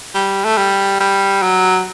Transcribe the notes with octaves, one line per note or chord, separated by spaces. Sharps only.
G3
A3
G3
G3
F#3